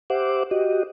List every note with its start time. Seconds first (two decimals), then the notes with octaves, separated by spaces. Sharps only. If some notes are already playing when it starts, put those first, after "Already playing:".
0.10 G4 C5 E5 F#5 D6
0.51 F#4 G4 D#5